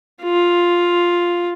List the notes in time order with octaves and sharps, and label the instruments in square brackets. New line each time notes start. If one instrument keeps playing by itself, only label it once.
[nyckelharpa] F4